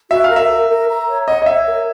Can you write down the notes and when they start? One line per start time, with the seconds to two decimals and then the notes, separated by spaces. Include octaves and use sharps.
0.11 F#4 E5
0.24 F5
0.30 A#4
0.36 E5
0.50 A#4
0.69 A#4
0.88 A#5
1.08 C#5
1.28 D#5 F#5
1.42 D#5
1.46 C#5 E5
1.66 A#4